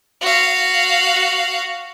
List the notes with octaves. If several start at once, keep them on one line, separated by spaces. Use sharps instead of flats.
F#4 F5